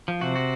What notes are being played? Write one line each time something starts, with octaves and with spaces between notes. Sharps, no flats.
F3
C3 F#4
F#4